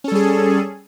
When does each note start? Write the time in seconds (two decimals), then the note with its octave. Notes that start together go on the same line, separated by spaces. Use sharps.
0.04 C#4
0.08 A4
0.12 G3
0.15 G#4